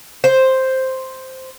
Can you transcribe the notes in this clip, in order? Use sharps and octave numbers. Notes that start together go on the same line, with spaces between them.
C5